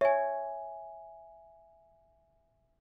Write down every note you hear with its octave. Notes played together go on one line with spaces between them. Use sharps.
C#5 E5 G#5